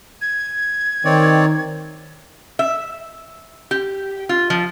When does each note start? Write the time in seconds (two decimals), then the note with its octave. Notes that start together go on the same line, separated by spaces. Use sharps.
0.21 G#6
1.05 D#3 C4 C#5 D5
2.59 E5
3.71 G4
4.29 F4
4.50 F3